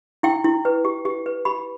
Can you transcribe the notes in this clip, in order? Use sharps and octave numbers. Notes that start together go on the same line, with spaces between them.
E4 G5
E4
B4
G4
G4
B4
G4 B5